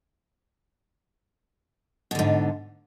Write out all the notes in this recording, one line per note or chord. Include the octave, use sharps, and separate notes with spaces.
G#2 B2 D3